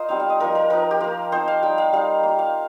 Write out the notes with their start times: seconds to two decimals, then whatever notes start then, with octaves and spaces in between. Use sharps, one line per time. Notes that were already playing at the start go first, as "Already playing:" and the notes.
Already playing: F4 A#4 C5 D#5
0.09 G3 C4 D#4 F5
0.20 F5
0.30 D#5
0.40 F3 A#3 D#4 A#4
0.55 A#4
0.70 F3 D#4 A#4
0.91 G4
1.01 A#3 F4 A#4
1.32 F3 C4 D#4 C5
1.48 F5
1.63 G3 D#4 G5
1.78 F5
1.93 G3 D#4 F5
2.23 A#3 F4
2.39 F5